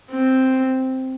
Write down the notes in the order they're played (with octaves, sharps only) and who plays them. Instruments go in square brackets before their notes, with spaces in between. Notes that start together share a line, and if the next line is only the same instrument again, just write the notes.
[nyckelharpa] C4